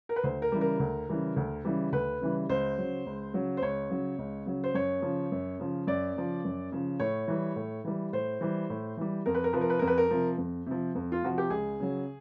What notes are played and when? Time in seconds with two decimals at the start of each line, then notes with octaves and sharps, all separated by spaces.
0.09 A#4
0.16 B4
0.23 D2 C5
0.42 A#4
0.52 C#3 E3 G3
0.61 A#4
0.80 D2
1.09 C#3 E3 G3
1.36 D2
1.65 C#3 E3 G3
1.92 D2 B4
2.21 C#3 E3 G3
2.49 C#2 C5
2.78 C#3 F#3
3.06 C#2
3.34 C#3 F#3
3.57 C5
3.62 C#2 C#5
3.90 C#3 F#3
4.19 C#2
4.46 C#3 F#3
4.64 C5
4.74 F#2 C#5
5.02 C#3 F3
5.32 F#2
5.60 C#3 F3
5.87 F#2 D5
6.16 C#3 F3
6.44 F#2
6.72 C#3 F3
7.00 A2 C#5
7.28 E3 G3
7.56 A2
7.84 E3 G3
8.13 A2 C5
8.41 E3 G3
8.70 A2
8.97 E3 G3
9.26 F2 A#4
9.35 B4
9.44 A#4
9.53 C3 F3 B4
9.61 A#4
9.70 B4
9.79 F2 A#4
9.87 B4
9.98 A#4
10.11 C3 F3
10.38 F2
10.66 C3 F3
10.95 F2
11.12 F4
11.23 C3 F3 F#4
11.38 G4
11.50 C#2 G#4
11.80 C#3 F#3